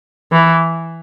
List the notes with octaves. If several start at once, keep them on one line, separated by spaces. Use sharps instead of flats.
E3